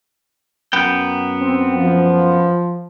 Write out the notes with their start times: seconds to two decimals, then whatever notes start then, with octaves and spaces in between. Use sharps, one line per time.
0.73 F#2 B3 G5
1.41 C4
1.76 F3